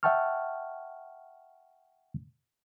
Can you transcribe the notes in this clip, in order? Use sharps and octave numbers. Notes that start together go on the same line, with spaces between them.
E5 F#5 G5 A5 C#6 F6